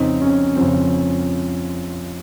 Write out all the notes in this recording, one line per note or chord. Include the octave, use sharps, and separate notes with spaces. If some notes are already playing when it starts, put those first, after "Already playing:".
Already playing: F2 C#3 F3 C4 D#4
C#4
F2 C#3 F3 C4